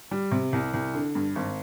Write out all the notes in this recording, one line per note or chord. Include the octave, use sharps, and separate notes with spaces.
G3
C3
C2
C2
D3
G2
G#1